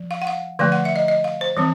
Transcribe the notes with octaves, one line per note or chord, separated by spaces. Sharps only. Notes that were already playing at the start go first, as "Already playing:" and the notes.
Already playing: F3
F5
F#5
F5
D3 F3 A3 F5
F#5
E5
D#5
D#5
F5
C5
E3 G3 C4